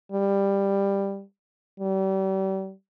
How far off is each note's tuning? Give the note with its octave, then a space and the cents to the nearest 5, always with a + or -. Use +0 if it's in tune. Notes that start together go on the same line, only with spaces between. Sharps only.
G3 +10
G3 -35